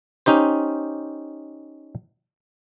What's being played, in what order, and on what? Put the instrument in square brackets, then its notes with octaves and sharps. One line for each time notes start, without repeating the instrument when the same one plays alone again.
[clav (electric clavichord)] C#4 D#4 G4 C5